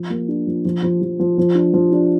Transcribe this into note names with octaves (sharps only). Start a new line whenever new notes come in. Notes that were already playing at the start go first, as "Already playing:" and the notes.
Already playing: F3
A#3
D4
F3
F3
F3
F3
F3
F3
D4
F3
D4